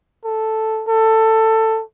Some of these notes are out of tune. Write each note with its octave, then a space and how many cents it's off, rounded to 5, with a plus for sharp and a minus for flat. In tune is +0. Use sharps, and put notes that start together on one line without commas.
A4 +0
A4 +15